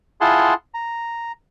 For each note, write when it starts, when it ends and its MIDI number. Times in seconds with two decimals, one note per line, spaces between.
0.21 0.54 64
0.21 0.54 65
0.21 0.54 68
0.21 0.54 78
0.21 0.54 81
0.21 0.54 84
0.74 1.32 82